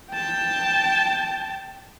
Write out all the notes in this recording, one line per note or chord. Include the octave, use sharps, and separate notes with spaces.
G5 A5